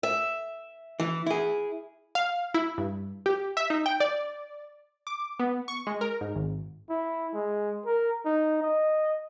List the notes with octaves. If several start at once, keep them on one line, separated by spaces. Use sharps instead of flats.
E5
E3
E4 G#4
F5
E4
G2
G4
E5
D#4
G5
D5
D6
B3
C#6
G#3
A#4
G#2
G#1
E4
G#3
A#4
D#4
D#5